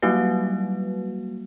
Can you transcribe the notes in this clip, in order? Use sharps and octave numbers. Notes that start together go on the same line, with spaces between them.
F#3 G3 A#3 F#4 B4